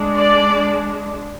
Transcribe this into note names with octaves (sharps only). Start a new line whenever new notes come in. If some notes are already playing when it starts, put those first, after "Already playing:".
Already playing: G#3 D4
D5